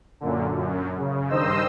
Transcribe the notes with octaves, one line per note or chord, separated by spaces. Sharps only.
F#2 A#2 D3
F#2
C#3
G2 D#3 C5 D#5 E6